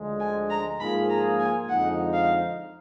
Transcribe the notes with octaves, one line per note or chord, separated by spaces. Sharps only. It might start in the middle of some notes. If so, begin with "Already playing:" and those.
Already playing: D2 D3 F3 G#3
G#5
A#5
G#2 F3 A#3 F4 G#4 B5
A#5
G#5
F2 D3 F3 G#3 D#4 F#5
F5